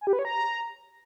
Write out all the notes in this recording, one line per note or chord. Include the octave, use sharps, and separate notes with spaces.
G#5
G4
B4
C#5
A#5